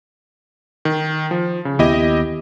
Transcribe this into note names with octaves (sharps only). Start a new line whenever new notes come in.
D#3
F3
C#3
D#2 B3 E4 G4 D#5